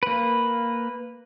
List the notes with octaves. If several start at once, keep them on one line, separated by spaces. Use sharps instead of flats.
A#3 B4